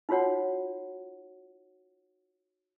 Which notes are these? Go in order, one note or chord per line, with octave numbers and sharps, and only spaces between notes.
D#4 F4 F#4 C#5 F#5